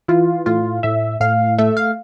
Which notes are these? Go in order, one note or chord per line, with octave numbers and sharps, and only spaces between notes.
E3 F4
A2 F4
A2 E5
A2 F5
A3 E5
F5